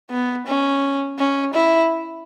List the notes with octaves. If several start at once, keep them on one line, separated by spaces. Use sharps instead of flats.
B3
C#4
C#4
E4